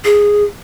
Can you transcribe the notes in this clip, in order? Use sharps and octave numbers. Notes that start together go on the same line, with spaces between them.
G#4